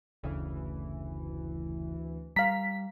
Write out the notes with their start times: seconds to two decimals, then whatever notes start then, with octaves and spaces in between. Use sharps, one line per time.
0.23 F#1 D2 C#3 E3
2.36 G3 F5 A#5 B6